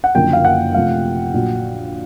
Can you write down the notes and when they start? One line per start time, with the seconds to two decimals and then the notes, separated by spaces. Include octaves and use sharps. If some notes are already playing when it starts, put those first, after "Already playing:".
0.04 F#5
0.15 F#1 F#2 D3 F3 A#3 G5
0.33 F5
0.45 F#5
0.74 C3 F3 A3 F5
1.34 A#1 A#2 F#3